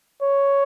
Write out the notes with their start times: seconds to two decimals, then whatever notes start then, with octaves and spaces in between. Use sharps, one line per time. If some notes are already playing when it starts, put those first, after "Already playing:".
0.22 C#5